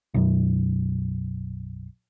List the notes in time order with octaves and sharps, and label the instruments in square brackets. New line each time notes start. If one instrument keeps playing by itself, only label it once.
[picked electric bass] B1 F#2